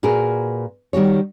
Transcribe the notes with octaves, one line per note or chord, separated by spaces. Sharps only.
A#2 F#4 G#4 A#4 B4
D#3 G3 F#4 C#5